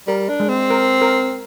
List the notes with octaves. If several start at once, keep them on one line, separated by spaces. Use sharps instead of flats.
G3 A#4
D4
G#3
C4
A#4
A#4